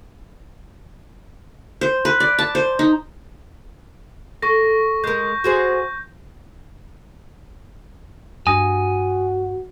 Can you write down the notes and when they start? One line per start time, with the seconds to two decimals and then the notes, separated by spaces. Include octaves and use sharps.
1.81 C5
2.05 B4
2.20 D5
2.39 A5
2.55 C5
2.79 D#4
4.42 A4 C#6 A#6
5.04 G#3 A#4 G6
5.44 F#4 G#4 C5
8.47 G2 F#4 G#5 D#6 A#6